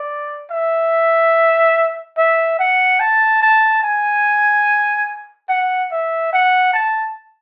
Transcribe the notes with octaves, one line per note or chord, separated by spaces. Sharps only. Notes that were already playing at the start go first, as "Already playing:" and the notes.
Already playing: D5
E5
E5
F#5
A5
A5
G#5
F#5
E5
F#5
A5